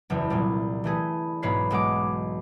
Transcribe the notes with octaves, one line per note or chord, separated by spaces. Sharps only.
F#1 E2
C2 A#2 G3
E3 A3 G#4 B4
B1 G#2 B4 C#5 C7
B1 G#3 F#5 D6